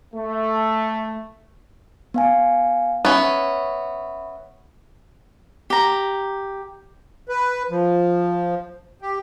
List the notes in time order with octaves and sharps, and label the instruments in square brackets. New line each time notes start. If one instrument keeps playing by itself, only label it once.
[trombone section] A3
[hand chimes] B3 F5 G#5
[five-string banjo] B3 C#4 [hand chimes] E5 B5 C#6
[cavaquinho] G4 A#5
[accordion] B4
F3
G4